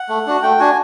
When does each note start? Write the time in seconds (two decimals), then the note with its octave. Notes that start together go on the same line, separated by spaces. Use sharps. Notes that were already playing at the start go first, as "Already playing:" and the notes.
Already playing: F#5
0.09 A3
0.27 D4 F#4
0.43 A3 G5
0.59 D4 F#4 G#5